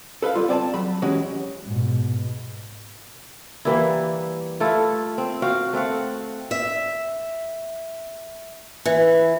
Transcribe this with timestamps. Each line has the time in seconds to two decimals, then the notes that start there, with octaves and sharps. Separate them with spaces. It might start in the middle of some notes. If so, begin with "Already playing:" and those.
0.22 A4 B4 E5 F5
0.35 G3 F4
0.49 C4 D5 G#5 A5
0.74 F#3 B5
1.02 E3 G#3 C#4 F#4 G4 C#5
1.65 G#2 B2
3.65 E3 G3 A#3 E4
4.60 A3 E4 F4 A4
5.18 C4
5.42 F#4 F5 G5
5.73 A3 C4 F5 F#5
6.51 E5
8.85 E3